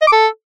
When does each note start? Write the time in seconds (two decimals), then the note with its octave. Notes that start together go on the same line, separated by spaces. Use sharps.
0.02 D#5
0.07 D6
0.12 A4